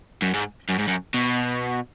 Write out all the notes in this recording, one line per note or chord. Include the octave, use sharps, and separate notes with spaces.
F#2
G#2
F#2
G#2
F#2
B2